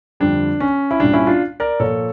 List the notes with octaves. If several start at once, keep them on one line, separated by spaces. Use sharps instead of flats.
F2 D3 G3 D4
C#4
E4
A#2 G3 D4
C#4 E4
D4 F4
A#4 D5
A#2 F3 A4 C#5